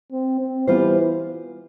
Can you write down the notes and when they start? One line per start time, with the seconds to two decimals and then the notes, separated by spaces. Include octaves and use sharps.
0.12 C4
0.40 C4
0.67 E3 G3 B3 F4 C5